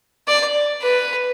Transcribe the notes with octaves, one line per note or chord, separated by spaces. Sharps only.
D5
B4